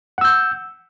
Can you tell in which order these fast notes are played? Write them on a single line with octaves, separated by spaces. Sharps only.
F#5 E6 G6